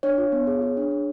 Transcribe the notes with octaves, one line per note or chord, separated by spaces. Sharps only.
D4 C#5
F4
B3
G#4
G#4
D4
D4